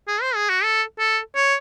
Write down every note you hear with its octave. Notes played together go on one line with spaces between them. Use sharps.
G#4
C5
G#4
F#4
A4
A4
C#5